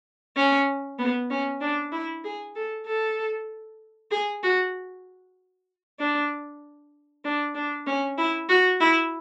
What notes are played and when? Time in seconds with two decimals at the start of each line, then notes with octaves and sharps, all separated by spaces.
0.36 C#4
0.99 B3
1.30 C#4
1.61 D4
1.92 E4
2.24 G#4
2.55 A4
2.86 A4
4.11 G#4
4.43 F#4
5.99 D4
7.25 D4
7.55 D4
7.86 C#4
8.18 E4
8.49 F#4
8.80 E4